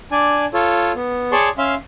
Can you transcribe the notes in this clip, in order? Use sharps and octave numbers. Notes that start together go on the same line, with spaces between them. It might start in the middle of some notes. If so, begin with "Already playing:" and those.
D4 D5 G#5
F4 A4 C#5
B3
G#4 C#5 D5 A5 C6 C#6
C#4 E5 F5 C6